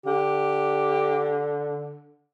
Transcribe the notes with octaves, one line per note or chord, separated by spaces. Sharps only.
D3 G4